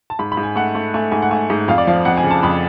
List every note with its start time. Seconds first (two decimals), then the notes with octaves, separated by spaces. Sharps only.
0.10 A5
0.19 G#2 B5
0.32 B5
0.37 G#2
0.43 G#5
0.56 A3 F#5
0.75 A3
0.94 A3 G#5
1.12 G#2 G#5
1.22 F#5
1.31 A3 G#5
1.50 G#2
1.68 F2 F5
1.78 D5
1.87 F3 F5
2.05 F2 F#5
2.17 G#5
2.24 C#3
2.31 A5
2.43 F2 B5